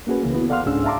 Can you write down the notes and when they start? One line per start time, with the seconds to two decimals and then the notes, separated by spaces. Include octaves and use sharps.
0.07 A#3 C#4 F#4 G#4 B4
0.23 C#2 C#3 E3 A#3
0.34 B3 E4 F#4
0.49 A4 D5 F5 F#5 C6 F6
0.66 C#2 G#2 C#4 D4 G#4 E6
0.84 E5 F5 A5 A#5 C6 D6